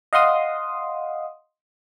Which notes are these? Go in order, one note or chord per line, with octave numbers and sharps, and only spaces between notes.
D#5 F5 F#5 C6 D#6